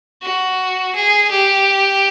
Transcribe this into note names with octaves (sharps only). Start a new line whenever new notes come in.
F#4
G#4
G4